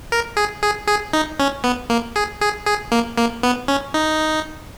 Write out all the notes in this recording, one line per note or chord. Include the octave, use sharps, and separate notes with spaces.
A#4
G#4
G#4
G#4
D#4
C#4
B3
A#3
G#4
G#4
G#4
A#3
A#3
B3
C#4
D#4